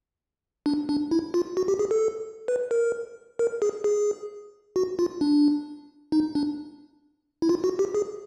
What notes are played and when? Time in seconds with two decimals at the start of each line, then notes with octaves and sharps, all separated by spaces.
0.66 D4
0.89 D4
1.11 E4
1.34 F4
1.57 F#4
1.68 G4
1.79 G#4
1.91 A4
2.48 B4
2.71 A#4
3.39 A#4
3.62 G#4
3.84 G#4
4.76 F#4
4.99 F4
5.21 D4
6.12 D#4
6.35 D4
7.42 E4
7.49 F4
7.64 F#4
7.79 G4
7.95 G#4